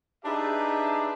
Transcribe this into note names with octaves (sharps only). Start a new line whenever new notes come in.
D4 D#4 G4 G#4 B4 E5